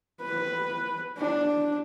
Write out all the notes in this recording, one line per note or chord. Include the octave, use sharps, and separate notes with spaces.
B4
D4